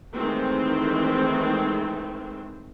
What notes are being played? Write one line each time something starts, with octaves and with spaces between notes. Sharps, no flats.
D#3 E3 G#3 A3 C4